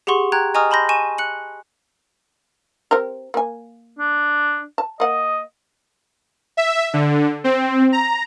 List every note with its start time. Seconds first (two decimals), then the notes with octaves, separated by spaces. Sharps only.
0.07 G4 G#4 F#5 C6 C#6
0.32 G5 A#5 F#6 G#6
0.54 D#5 G#5 A#5 C#6 D#6 F6
0.71 A5 B5 C6 G6 A#6
0.89 G#5 C#6 D#7 E7
1.18 F#6 C#7 F#7
2.91 C4 G4 A#4
3.34 A#3 G#5
3.99 D4
4.78 A5
5.00 A#3 D#5 F#5
6.57 E5
6.93 D3
7.44 C4
7.92 A#5